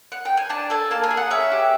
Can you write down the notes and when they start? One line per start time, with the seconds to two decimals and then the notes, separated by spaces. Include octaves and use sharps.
0.12 F#5
0.25 G5
0.37 G#5
0.49 D4 A5
0.70 A4 G#5
0.91 A#3 A5
1.04 G#5
1.11 G#4
1.17 F#5
1.30 C#4 E5
1.52 G4